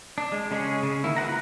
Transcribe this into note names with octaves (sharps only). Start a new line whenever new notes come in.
D4
G#3
C#3 G#3 C#4 G#4
C#3
D#3 A#3 E4
F4 B4 F#5 A#5